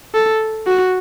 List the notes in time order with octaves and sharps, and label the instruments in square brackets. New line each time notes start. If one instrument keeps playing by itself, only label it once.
[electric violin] A4
F#4